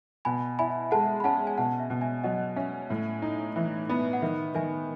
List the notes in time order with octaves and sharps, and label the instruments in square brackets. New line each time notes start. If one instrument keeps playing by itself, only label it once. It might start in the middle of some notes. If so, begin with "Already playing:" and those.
[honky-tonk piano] B2 [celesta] G#5 B5
[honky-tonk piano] E4 [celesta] G#5 B5
[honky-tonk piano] G#3 [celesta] F#5 A5
[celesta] B5
[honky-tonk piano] C#4 [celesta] F#5 A5
[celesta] G#5
[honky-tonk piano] B2 [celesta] F#5 A5
[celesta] E5
[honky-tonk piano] B2
[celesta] E5 G#5
G#5
[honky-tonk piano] F#3 [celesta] D#5 F#5
[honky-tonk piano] C#4 [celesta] E5
[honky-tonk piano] A2 [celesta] E5
[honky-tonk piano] D#4
E3
B3
[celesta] F#5
[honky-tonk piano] D#3 [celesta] E5
[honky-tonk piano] D#3 [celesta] E5 G#5